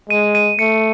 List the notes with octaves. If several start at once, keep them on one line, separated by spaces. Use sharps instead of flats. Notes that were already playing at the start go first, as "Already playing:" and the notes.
G#3 D#7
D#7
A3 C#7